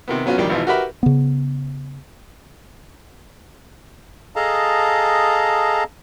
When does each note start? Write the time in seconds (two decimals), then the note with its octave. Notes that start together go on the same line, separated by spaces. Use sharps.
0.08 C3 D#3 B3
0.26 F#3 B3 C#4 F4 F#4
0.38 A#1 D#3 G3 G4
0.50 G#1 B2 E3 F4
0.67 F#4 G4 A#4 B4 E5 B5
1.03 C#3 B3
4.36 G#4 A4 D#5 F5 A5 A#5